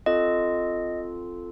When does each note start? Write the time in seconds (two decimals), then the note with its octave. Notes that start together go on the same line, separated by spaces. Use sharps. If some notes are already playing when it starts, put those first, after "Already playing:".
0.06 C4 F4 A4 D#5